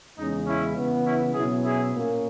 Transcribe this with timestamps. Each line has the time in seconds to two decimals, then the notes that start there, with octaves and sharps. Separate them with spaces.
0.17 E2 C#3 G#3 C#4 D#4
0.47 C#4 E4
0.76 C#3 E3 B3
1.05 C#4 E4
1.33 B2 F#3 C#4 E4 G#4
1.63 E4 G#4
1.93 A#2 A#3 C#4